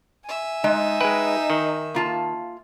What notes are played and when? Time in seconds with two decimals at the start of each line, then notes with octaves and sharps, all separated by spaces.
0.24 E5 G#5
0.64 G#3 D#4
1.01 G#3 B4 G5
1.50 D#3
1.95 A#3 F4 A5